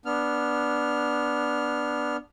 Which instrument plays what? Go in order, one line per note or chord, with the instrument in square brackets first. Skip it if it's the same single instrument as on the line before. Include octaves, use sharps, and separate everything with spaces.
[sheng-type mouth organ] B3 D4 F6